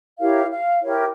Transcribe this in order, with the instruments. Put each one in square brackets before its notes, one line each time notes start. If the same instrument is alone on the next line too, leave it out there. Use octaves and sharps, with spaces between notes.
[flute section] E4 G4 A#4 C#5 F5
F5
E4 G4 A#4 C#5